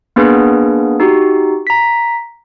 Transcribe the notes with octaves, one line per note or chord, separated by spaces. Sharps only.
A#3 B3 D4 G#4 B4
D#4 F#4 G4
A#5 B6